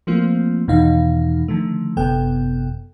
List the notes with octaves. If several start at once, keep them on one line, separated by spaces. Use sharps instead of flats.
F3 A3 A#3 C4 F4
E2 B2 D#3 E3 D#4 F5
D3 D#3 F3 A3
G1 F#2 C3 B3 A4 G5